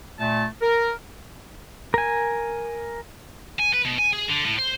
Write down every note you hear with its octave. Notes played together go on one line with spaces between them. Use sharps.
A#2 A3 A5
A#4
A#4 G#5
G#5
B4
B2
G#5
G#4
D3
A2
C5